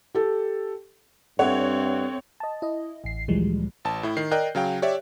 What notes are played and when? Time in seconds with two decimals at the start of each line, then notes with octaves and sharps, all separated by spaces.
0.15 G4 A4
1.39 G2 C4 A4 C#5 E5 F#5
2.40 D#5 A5
2.62 E4 D#5
3.04 A1 C7
3.28 D2 A#2 E3 F3 G3 G#3
3.85 A1 A5
4.03 A2 E4
4.17 D#3 C7
4.31 A#4 D5 D#5 G5 F#6 G6
4.55 C#3 F#3 F5 G5
4.82 G4 C#5 D5 E5